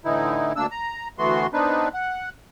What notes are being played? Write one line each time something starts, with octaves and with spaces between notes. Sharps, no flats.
A2 D3 E3 D#4 E4
D2 A#3 D4 E6
A#5
D2 E3 A3 B3 F#4 C6
B3 C4 D4 D#4 B4
F#5